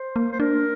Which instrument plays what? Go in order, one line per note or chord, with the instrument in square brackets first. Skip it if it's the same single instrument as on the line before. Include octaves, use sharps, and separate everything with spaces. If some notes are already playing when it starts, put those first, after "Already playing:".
Already playing: [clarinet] C5
[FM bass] A#3
[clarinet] C5
[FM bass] D4 [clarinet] A#4